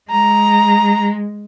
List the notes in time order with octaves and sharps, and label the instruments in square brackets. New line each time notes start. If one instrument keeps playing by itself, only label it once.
[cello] G#3 [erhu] A#5